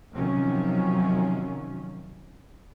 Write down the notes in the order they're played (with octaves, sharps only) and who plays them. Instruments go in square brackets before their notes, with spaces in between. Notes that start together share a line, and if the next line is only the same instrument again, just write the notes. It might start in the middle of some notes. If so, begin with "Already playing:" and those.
[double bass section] C3 D#3 F3 F#3 C#4